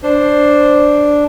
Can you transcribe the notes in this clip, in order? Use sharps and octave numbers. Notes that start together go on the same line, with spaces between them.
D4 C5